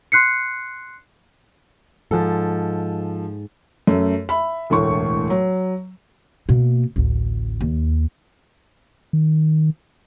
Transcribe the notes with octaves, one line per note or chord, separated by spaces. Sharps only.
C6 F#6 C7 C#7
G#2 F3 A4
F#2 A3
E5 B5
E1 D2 A2 C#6
F#3
B2 A#3
A1 D2
D#2
D#3